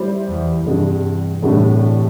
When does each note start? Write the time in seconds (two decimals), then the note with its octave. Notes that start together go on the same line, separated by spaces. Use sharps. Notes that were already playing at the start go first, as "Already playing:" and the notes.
Already playing: G3 E4 C5
0.28 E2
0.66 E2 G2 C3 G3 D4
1.42 E2 A2 C3 G3 D4